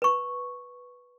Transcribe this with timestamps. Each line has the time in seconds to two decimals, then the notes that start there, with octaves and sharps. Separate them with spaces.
0.02 B4 C#6